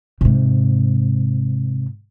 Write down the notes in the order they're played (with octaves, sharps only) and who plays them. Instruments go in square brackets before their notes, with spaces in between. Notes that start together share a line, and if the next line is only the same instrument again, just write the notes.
[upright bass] G#2 C3